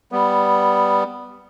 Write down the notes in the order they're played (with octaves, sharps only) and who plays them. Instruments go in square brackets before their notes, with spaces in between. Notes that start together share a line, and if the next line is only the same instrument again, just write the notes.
[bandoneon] G3 B3